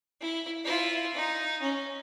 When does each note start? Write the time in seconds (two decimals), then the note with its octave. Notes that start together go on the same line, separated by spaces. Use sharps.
0.21 E4
0.65 E4 F4
1.14 D#4
1.62 C#4